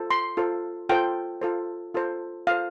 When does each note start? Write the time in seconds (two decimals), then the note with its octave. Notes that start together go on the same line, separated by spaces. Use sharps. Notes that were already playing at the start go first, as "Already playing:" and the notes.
Already playing: F4 A4 C5
0.11 C6
0.37 F4 A4 C5
0.89 F4 A4 C5 G5
1.41 F4 A4 C5
1.94 F4 A4 C5
2.47 F4 A4 C5 F5